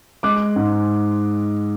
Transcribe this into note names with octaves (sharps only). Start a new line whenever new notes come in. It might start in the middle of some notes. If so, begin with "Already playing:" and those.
G#3 D6 F#6
G#2